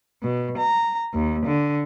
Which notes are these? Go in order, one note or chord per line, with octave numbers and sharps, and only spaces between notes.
B2
A#5
D#2
D3